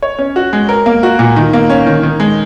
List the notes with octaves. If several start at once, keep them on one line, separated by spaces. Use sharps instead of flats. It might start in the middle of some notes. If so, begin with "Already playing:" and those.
C#5
C#4
F#4
G#3
A#4
A#3
F#4
A#2
D#3
A#3
C#4
D#3
D#3
G#3